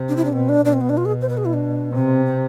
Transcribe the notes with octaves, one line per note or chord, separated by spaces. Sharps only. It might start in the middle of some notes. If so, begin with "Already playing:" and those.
Already playing: C3
D4
E4
D4
B2 C4
D4
B2 D4
C4
B3
D4
F4
G#4
C5
B4
G#4
E4
D4
C3 C4
C4